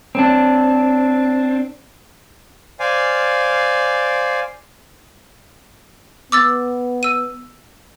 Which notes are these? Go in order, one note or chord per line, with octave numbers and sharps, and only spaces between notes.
C4 D4
C5 D5 F5 G#5
B3 D6 E6 A6
E6 D#7